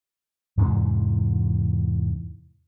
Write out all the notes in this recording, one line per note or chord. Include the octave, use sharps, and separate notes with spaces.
E2 G#2 C3 E3